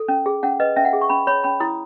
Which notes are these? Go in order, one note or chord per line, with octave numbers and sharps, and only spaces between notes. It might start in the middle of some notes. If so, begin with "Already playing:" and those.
Already playing: A4
C#4
G#4
C#4 F#5
B4 D#5
C#4 E5
F#5
G#4
C#6
C#4 B5
C#5 B5
C#4 B5
E4 D#6